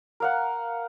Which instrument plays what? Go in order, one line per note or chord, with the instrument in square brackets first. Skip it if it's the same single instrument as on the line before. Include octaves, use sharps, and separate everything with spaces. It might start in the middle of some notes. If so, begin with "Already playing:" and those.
[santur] A#4 F5 F#5